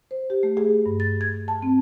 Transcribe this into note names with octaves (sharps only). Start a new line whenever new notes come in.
C5
G4
A3
G#4
G2
A6
G#6
A5
C4